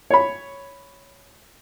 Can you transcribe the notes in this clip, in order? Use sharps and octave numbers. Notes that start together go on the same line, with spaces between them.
C#5 B5